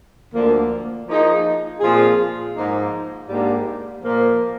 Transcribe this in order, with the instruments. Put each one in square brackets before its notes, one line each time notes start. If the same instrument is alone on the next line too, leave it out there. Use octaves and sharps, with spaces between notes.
[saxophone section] D2 D3 F3 A#3
F3 A#3 D#4 G#4
A#2 F3 C4 F4 G#4
G#2 F3 A#3 D#4
G#2 G3 A#3 D4 G4
A#2 F3 A#3